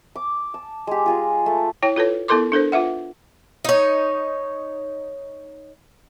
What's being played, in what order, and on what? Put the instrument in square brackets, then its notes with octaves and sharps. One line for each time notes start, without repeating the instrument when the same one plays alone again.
[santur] D6
A5
G#3 G4
F4 G#4 A#5
A3
[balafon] E4 C#5 G5
F4 A4 B4 C#5
B3 E4 A4 A#4 C6 D6
D4 A4 A#4 C5
F4 B4 E5 F#5
[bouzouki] D#4 C#5